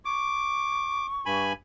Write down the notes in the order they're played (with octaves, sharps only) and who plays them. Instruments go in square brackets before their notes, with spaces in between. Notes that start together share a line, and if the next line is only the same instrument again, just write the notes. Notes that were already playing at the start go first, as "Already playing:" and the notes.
[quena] C#6 [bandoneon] D6
[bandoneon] G2 G#5 B5